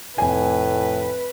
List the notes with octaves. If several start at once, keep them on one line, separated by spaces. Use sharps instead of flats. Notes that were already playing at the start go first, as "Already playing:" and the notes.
F1 A2 B4 G5 G#5